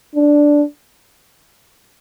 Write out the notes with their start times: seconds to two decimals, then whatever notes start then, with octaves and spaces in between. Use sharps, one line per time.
0.15 D4